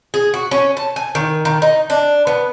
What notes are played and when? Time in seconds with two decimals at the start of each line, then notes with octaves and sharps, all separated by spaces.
0.14 G#4
0.34 F#4
0.51 C#4
0.77 A5
0.96 G#5
1.15 D#3
1.45 D#3
1.62 D#4
1.90 D4
2.27 B3